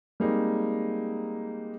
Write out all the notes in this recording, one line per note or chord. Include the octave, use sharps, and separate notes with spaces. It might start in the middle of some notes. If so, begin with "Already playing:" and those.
G3 G#3 A#3 C4 D#4